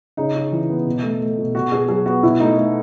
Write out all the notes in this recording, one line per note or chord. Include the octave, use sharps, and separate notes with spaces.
C#3 D#4
C#3
E3
B3
B2
A3
A3
B2
B2 F#4
B2 G#4
F#3 G#4
B3 F#4
B2 E4
A3 D#4
A3